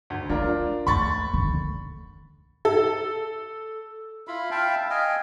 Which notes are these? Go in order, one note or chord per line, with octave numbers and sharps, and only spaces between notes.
D2
A3 D4 F4 A#4
D#2 A3 B5 C#6 A6
D3 D#3
A4
E4 F4 B5
E5 F5 G5 A5
D#5 F5 G5 G#5